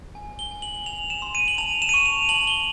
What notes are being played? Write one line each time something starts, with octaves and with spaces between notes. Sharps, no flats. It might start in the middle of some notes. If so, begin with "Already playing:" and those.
G#5
G7
G#5
F#7
G#5 F7
E7
C6
D#7
F#7
A5 F7
E7
D#7
C#6 E7
F7
A5 F#7
G7